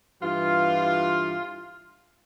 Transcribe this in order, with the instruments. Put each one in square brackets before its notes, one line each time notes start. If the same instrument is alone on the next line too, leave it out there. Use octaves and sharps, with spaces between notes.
[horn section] G2 E3 F4